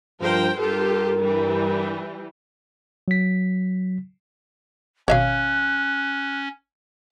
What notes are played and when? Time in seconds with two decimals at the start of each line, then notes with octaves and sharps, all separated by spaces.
0.20 G2 F3 A#4 C5 G5
0.58 G2 F4 G4 A4 A#4
1.21 E3 G3
3.08 F#3 B6
5.08 G#1 B2 C#4 C#5 E5 F5 F#6